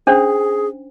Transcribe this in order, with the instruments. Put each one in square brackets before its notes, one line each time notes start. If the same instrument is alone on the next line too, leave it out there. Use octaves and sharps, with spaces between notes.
[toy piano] C#4 D4 C5 [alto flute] G#4